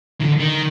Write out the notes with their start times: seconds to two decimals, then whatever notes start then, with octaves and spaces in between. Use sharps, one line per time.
0.21 D#3
0.25 D3
0.39 D#3